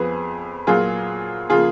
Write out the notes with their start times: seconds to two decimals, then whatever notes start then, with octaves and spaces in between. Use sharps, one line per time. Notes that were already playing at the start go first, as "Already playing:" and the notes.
Already playing: F2 F3 B3 G#4 B4
0.67 A#2 F#3 A#3 F4 G#4
1.50 C#3 F3 A#3 F4 G#4